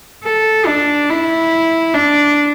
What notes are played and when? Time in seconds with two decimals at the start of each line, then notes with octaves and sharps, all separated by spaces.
0.24 A4
0.67 D4
1.10 E4
1.94 D4